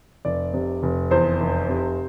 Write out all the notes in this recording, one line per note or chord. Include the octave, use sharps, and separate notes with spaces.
F1 D5
C3
F1
E2 C5
F1
C3